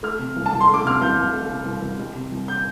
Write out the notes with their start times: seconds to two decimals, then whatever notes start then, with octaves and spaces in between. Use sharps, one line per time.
0.03 A3 F6
0.19 C3
0.36 C2
0.46 A5
0.53 C2
0.61 C6
0.69 A3
0.74 D6
0.84 C3 F6
1.01 C2 G6
1.17 C2
1.34 A3
1.50 C3
1.66 C2
1.82 C2
1.99 G3
2.15 C3
2.32 C2
2.48 G6